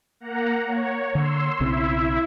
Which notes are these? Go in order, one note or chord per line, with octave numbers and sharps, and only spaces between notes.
A#3 F#5 A#5
C#5
D3 C6 E6
B1 C#3 C4 E4 E5